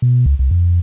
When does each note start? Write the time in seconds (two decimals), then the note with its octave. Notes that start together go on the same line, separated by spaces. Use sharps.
0.02 B2
0.26 C#2
0.39 C2
0.51 F2